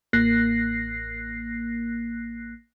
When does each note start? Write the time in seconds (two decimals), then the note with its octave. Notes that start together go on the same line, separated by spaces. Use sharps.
0.13 A1 A#3 F#6 A#6 C7